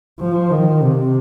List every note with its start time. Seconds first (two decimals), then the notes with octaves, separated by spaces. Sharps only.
0.20 F3
0.51 D#3
0.82 C3